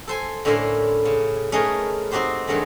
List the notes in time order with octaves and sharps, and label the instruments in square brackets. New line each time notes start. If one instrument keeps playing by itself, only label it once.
[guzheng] A4 C5 G#5
A2 D3 C#4 E4 A#4 C5
C#3
A3 C#4 D#4 G#4 A#4 B4
C4 D#4 F#4 G4 C5
G2 D#3 F#3 G#3 A3 G4